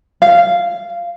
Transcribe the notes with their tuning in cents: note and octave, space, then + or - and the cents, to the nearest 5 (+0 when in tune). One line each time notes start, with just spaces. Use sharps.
F5 -10